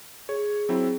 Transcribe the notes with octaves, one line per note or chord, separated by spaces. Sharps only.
G#4 C#5
F#3 C4 E4